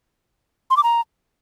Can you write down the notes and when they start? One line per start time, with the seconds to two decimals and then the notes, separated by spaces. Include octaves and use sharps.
0.70 C6
0.77 D6
0.83 A#5